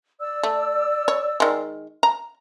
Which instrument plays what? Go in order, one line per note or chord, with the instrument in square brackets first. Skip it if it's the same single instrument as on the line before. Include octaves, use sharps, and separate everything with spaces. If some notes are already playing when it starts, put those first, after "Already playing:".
[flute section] D5 E6
[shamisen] A3
C#5
D#3 G#3
A#5